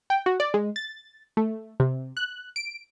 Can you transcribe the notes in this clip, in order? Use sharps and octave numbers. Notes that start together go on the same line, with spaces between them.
G5
F#4
D5
G#3
A6
A3
C3
F#6
D7